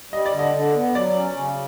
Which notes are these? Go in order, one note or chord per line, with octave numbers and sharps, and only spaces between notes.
G3 D#5
D5
D3
D#5
D3
B3
F#3 D5
C#4
C#3